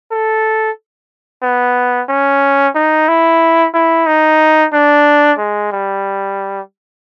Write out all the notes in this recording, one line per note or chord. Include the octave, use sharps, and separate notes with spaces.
A4
B3
C#4
D#4
E4
E4
D#4
D4
G#3
G3